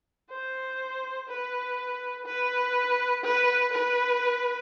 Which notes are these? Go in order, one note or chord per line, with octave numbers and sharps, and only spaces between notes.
C5
B4
B4
B4
B4